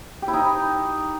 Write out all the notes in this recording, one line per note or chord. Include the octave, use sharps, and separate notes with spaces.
G4
E4
D#4